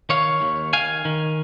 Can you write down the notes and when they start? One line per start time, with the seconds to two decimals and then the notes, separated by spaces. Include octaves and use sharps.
0.09 D#3 C#5 F5
0.42 D#2
0.73 D#3 F5 G#5
1.05 D#3